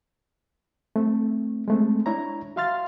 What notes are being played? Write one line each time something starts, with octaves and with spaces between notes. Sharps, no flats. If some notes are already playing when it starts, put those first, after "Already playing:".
A3 C4
G#3 A3 C4
D4 E4 C#5 A#5
F#4 E5 F5 C6 F6 A6